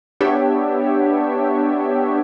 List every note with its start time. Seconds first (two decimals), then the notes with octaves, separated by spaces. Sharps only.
0.20 B3 D4 G4 C#5 E5